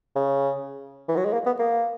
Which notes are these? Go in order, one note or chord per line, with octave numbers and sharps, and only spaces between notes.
C#3
E3
F#3
G#3
A#3
B3
A#3